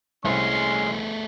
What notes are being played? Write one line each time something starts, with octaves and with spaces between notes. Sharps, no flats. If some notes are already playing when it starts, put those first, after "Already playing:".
C2 G#3 A3 C#4 G#4 C6